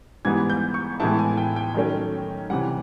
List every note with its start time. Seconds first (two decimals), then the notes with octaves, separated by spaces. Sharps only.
0.25 G#2 E3 G3 B3 G#6
0.50 G6
0.74 C#6
1.00 A2 E3 G#3 B3 E4 A5
1.19 G#5
1.37 G5
1.56 G5
1.75 D#3 F#3 A3 C#4
2.50 C3 E3 G3 F#5